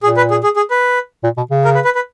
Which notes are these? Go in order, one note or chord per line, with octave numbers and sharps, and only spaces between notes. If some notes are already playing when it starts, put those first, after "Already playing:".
A#2 G#4
B4
G#4
G#4
G#4
B4
A#2
B2
C#3
A#4
B4
B4
B4